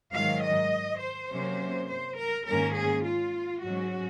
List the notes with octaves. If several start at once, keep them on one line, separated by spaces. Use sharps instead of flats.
G#2 D#3 F#3 F5
D#5
C5
C3 F#3 A#3 C#4
C5
A#4
G#2 D#3 A#3 C#4 A#4
G#4
F4
G#2 F#3 C#4 F#4